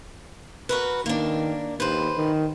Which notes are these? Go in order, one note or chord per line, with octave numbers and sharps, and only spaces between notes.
F#4 A#4 B4
D#3 A#3 D4
D#2 B4 C5
D#3